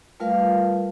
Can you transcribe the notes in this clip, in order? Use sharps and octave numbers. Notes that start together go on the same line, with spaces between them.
G3 A3 F4 A#4 B4 F5